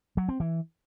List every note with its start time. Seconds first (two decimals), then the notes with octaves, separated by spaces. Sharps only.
0.17 F#3
0.29 C4
0.40 E3